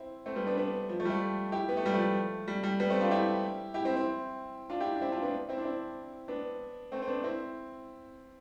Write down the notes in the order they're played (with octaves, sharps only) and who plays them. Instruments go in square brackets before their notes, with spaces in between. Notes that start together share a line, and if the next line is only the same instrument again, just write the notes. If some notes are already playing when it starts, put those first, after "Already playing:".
Already playing: [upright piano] C4 E4
A3 C4
G3 B3
B3 D4
B3 D4
F3
F3 A3
G3
F3 A3
E4 G4
B3
A3
G3
F3 A3
G3
G3
G3 B3
A3 C4
D4 F4
E4 G4
E4 G4
C4 E4
C4 E4
D4 F4
E4 G4
D4
C4 E4
D4 F4
B3 D4
C4 E4
D4
C4 E4
B3 D4
A3 C4
C4
B3 D4
C4 E4